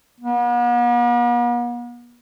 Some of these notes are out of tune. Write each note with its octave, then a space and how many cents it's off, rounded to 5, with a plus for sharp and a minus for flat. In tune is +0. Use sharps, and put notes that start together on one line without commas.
B3 -45